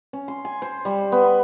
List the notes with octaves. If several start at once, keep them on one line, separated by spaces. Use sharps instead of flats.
C#4
C6
G#5
C5
G3
B3